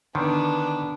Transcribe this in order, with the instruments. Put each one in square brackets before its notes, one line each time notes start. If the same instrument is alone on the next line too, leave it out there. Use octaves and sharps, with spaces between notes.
[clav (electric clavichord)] D3 D#3 [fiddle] B3 D4